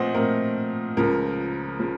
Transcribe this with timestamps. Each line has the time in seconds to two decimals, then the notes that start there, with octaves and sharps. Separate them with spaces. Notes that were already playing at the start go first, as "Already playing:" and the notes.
Already playing: A#2 F3 A3 C4 C5 D#5 F#5
0.14 A#2 F3 A3 C4 A#4
0.97 C#2 C#3 F3 A#4
1.80 C#3 F3